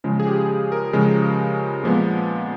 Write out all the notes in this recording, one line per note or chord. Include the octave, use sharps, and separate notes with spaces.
C#3 F3 G#3
G#4
G4
G#4
A#4
C#3 F3 G#3
A#2 F3 G#3 B3